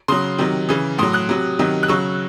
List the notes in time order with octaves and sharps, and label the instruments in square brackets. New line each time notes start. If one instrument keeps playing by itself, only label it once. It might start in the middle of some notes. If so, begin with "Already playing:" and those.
[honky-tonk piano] C#3 F#3 C6 D#6
C3 D#3 F#3
C#3 E3
A2 F#3 C6 D#6
D#6 F#6
C3 F#3
C3 D#3 F#3
F#6
C#3 F#3 C#6 E6